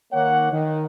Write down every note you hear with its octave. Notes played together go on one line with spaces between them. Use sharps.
D#3 A#3 C#5 F#5
D#3